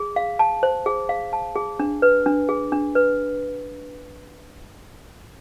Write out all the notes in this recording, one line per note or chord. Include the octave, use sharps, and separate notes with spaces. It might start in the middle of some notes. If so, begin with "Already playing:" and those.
Already playing: G#4
F5
A5
C5
G#4
F5
A5
G#4
D4
B4
D4
G#4
D4
B4